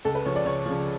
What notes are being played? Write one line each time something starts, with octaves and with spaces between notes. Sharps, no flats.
C#2 A4
B4
C#3 F3 C#5
D5
C#2 C#5
C#3 F3